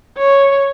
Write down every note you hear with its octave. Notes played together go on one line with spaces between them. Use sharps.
C#5